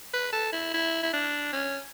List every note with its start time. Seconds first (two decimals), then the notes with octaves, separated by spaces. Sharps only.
0.14 B4
0.33 A4
0.52 E4
0.74 E4
1.03 E4
1.13 D4
1.53 C#4